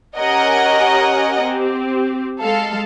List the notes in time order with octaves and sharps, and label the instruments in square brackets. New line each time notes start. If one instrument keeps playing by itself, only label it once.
[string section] C#4 G4 A#4 D#5 F#5 G#5
C4 G4
G#3 A4 F5